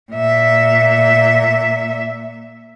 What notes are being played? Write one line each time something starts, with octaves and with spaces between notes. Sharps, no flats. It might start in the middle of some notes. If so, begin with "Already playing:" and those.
A#2 E5